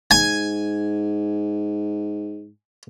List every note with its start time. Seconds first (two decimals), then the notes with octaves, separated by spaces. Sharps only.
0.11 G#2 G#5